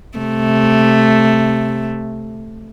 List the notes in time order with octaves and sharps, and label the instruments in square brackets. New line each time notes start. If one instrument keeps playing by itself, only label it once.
[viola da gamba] C3 A3